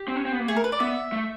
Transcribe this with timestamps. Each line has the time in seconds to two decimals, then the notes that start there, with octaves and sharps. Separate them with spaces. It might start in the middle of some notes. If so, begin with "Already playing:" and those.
Already playing: G4
0.08 C4
0.16 C#4
0.26 C4
0.33 B3
0.40 A#3
0.48 A3 G#4
0.56 A#4
0.64 B4
0.72 D5
0.80 B3 E5
1.13 A3